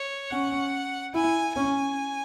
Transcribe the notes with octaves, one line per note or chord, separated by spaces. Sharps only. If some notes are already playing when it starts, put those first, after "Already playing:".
Already playing: C#5
C#4 F#5
E4 G#5
C#4 G#5